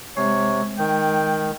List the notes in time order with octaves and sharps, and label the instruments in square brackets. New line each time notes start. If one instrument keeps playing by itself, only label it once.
[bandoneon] C3 [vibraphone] G#3 [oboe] C#5
[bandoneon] D#3 [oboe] G5